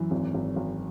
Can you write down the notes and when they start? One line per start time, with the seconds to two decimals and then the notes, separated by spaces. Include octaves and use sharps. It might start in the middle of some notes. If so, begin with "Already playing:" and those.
Already playing: F#2 E3
0.11 G#1
0.34 G#1
0.56 G#1